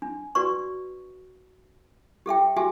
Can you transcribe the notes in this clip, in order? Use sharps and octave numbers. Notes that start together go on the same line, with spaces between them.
D4
F#4 B4 D5 C#6
G4 A4 E5 G5
F#4 G4 A4 E5 G#5